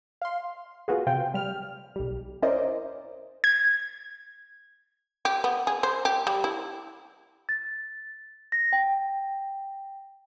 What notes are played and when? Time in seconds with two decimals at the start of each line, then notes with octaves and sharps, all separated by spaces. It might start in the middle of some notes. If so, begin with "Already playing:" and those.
0.22 F5 C6
0.88 B3 F4 F#4 G#4
1.07 C3 F4 G5
1.34 G3 F6
1.96 B1 G3
2.42 C#4 E4 A#4 C5 D5 D#5
3.44 G#6
5.25 G4
5.44 B3
5.67 G#4
5.83 C5
6.05 G4
6.27 G3
6.44 E4
7.49 A6
8.52 A#6
8.73 G5